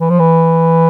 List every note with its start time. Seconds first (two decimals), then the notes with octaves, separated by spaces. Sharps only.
0.01 E3
0.10 F3
0.20 E3